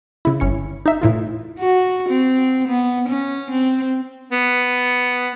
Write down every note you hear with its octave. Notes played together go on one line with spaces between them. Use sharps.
C#3 E4
G1 C#4 C#7
D#4 E5
A2 E3 F4
F#4
C4
B3
C#4
C4
B3